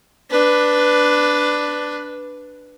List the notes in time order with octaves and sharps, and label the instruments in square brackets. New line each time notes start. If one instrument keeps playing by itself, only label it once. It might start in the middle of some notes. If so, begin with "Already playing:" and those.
[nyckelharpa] D4 B4